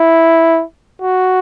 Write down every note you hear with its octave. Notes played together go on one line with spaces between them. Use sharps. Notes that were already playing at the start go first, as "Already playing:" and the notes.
Already playing: E4
F#4